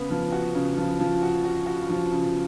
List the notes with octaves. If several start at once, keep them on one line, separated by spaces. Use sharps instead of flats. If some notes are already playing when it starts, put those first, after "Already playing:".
Already playing: C#3 B3
F3
F#4
C#3
F3
F3
F#4
F#4
F#4
F3
C#3